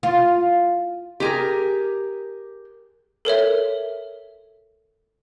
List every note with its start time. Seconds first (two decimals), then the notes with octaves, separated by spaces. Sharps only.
0.03 F4
1.20 G4 G#4 A#4
3.25 A4 A#4 C#5 E5